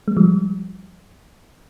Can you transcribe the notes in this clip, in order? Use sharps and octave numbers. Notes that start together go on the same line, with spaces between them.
G#3
F3 G3